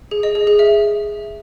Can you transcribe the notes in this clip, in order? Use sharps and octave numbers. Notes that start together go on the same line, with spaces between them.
G#4
D#5
G#4
G#4
E5